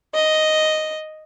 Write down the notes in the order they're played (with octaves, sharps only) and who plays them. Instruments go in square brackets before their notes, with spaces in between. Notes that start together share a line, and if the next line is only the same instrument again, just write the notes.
[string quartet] D#5